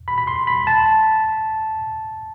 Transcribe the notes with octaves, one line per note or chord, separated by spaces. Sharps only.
B5
B5
C6
B5
A5